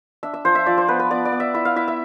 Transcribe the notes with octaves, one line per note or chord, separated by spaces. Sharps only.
D4 E5
E5
F3 C5
E5
F3 D5
C5
B3 B4
B4
B3 D5
D5
B3
E5
E4 E5
F5
E4 E5
E5